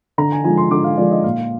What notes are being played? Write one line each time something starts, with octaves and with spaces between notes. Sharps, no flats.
D3 A#5
G#5
F3 G#3 G#5
C6
D3 D6
F5
F3 G#3 D5
D#5
A#2 F5